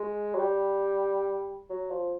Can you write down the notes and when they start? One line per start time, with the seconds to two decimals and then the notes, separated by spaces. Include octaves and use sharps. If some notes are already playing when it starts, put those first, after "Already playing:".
Already playing: G#3
0.35 F#3
0.40 G3
1.70 F#3
1.90 F3